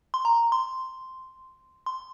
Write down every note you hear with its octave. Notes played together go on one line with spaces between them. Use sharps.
C6
A#5
C6
C6